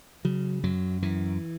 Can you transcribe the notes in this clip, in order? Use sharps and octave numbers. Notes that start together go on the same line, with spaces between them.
C#3 F#3
F#2 F#3
F#2 E3